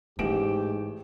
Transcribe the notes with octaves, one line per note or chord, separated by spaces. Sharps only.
A1 G#2 A3 G4 D7 E7